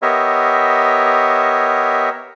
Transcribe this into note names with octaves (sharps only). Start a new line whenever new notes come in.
B3 G4 A#4 C#5 D#5 E5